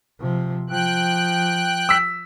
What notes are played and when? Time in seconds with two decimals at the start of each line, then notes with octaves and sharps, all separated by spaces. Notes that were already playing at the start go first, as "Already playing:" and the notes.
0.21 C3 F3
0.70 F3 G5 F#6
1.89 E6 B6